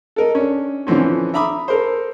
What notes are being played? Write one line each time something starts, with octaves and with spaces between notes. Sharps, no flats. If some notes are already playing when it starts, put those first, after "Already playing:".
A4 A#4 D#5
C#4 D4
D3 E3 F3 C4 C#4
E5 A#5 B5 D6 D#6
A4 A#4 C5